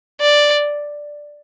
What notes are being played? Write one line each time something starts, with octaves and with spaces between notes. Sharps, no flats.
D5